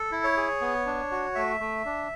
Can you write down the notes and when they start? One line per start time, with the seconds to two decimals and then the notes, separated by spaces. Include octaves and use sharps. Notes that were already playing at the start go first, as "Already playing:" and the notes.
Already playing: A4
0.12 E4
0.24 C#5
0.37 G#4
0.61 B3
0.86 D4
1.11 F#4
1.35 A3 E5
1.60 A3
1.85 D4